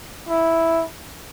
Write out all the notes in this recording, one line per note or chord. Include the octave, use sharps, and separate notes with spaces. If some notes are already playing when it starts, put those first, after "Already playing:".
E4